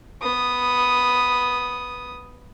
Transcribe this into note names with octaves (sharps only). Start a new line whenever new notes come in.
B3 D#6